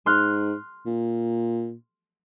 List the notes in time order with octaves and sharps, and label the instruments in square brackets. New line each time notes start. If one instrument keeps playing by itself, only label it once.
[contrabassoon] G#2 [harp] C6 F6 F#6
[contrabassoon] A#2